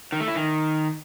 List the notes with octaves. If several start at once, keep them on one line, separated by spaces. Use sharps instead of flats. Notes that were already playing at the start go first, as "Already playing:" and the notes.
D#3
A3
E4
D#3